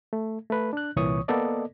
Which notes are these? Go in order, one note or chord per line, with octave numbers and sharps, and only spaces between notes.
A3
A3 B4
D4 F#6
C2 A#2 E3 C#5 C#6 D#6
A#3 B3 A4 D5 D#5